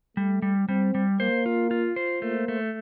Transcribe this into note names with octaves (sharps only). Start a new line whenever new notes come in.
G3 A3
G3
G3 C4
G3
A#3 C5
F4
F4
C5
A3 A#3
A3